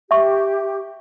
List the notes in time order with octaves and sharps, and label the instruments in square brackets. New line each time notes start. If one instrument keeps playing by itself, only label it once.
[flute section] G4 [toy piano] E5 C#6